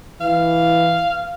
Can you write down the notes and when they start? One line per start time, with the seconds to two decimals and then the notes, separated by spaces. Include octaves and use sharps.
0.21 E3 F5